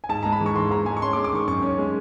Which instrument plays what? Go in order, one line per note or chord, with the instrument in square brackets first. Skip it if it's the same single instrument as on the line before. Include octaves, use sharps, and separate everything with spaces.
[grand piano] G#5
G#2 A5
G#3 A#5
B5
E3
C#6
G#2 C6
G#2 A#5
G#3 G#5
C#6
C#4 C6
D6
G#3
D6
D#3 C#6
F#2 C#6
C#4
G#3